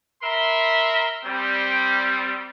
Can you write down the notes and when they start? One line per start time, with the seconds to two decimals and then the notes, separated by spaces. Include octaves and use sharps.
0.22 A#4 E5 B5 C6
1.25 G3 C4